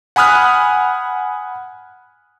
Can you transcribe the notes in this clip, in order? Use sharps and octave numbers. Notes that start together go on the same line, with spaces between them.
F#5 G#5 B5 D#6 F6 F#6